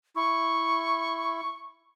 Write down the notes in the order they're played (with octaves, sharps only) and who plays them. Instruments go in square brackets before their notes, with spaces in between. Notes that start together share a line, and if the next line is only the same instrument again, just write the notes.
[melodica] E4 [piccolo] C#6